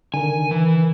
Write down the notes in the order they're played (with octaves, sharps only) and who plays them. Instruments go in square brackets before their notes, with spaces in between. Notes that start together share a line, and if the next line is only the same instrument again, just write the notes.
[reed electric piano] D3 D#3 A#4 [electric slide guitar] G#5
[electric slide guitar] E3